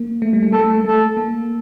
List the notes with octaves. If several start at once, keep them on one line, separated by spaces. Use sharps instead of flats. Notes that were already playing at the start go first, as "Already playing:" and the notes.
Already playing: A#3
A3
G3
A3
A#3 A4
A3
A3 A4
A#3